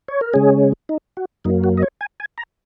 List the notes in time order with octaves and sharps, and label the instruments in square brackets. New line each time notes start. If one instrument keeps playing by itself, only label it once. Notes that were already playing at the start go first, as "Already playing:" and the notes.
[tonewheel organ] C#5
A#4
C#3 G#3 C#4 G#4
D#4
F#4
F#2 F#3 A#3 D#4
F#4
D#5
C#5
G#5
G#5
A#5